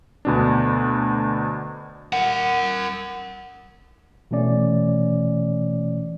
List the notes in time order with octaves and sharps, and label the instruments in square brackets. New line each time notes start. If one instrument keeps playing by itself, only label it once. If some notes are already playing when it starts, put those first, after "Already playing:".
[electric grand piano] D2 B2 D4
[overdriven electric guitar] A#4 F#5
[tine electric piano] B2 E3 A3 C#4 D5